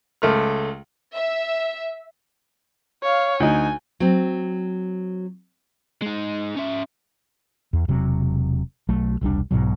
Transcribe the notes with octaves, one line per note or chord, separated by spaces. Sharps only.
C#2 A3 F6
E5
C#5 F5
D2 D#4 G#5
F#3 C4
G#3 D#4
C#4 E5
E2
E1 C3 F#3
B1 F#3 A3
E1 C2 G3 D4
B1 G#2 B2 F#3